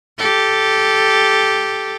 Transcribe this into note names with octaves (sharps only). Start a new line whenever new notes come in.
G4 A4